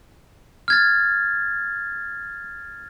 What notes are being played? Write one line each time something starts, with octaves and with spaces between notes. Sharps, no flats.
F6 G#6 A6